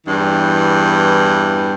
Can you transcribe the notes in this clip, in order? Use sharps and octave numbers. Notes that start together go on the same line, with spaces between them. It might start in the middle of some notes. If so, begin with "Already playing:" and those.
E2 G2 E3